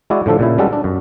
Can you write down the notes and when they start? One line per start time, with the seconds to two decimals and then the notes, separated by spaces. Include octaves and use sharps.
0.10 G#3 E4 F#4 D5
0.26 A2 D3 F3 A4
0.39 A#2 C#3 E4
0.58 C#3 G3 G#3 C#4 F#4 A4
0.73 D4
0.84 F#2